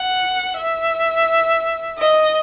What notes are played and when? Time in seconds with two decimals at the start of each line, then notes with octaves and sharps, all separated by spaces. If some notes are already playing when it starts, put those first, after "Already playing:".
Already playing: F#5
0.58 E5
1.99 D#5